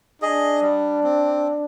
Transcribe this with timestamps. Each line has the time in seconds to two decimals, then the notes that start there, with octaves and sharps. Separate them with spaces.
0.22 D4 G#4 D#5
0.61 G3
1.03 C4